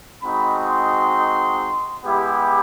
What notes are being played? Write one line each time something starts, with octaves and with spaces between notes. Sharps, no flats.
G#3 C4 D#4 F#4 B5
C6
G#3 B3 E4 G4